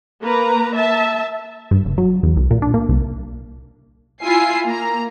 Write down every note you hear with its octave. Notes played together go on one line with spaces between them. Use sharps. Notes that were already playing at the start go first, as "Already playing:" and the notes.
A#3 B4 A#5
E5 A5
G2
F#1
F#3
E2
C2
A#2
D4
A#3
C2
E4 F4 G#5 C7
A#3 A#5